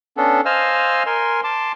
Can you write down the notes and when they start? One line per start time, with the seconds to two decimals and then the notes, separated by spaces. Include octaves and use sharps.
0.17 B3 C#4 D4 A4
0.45 C5 D#5 F5 G#5 E6 F6
1.06 A#4 G#5 C6
1.44 A5 C6 D6